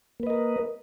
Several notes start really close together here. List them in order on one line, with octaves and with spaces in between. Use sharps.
A#3 B4 D#5 A#4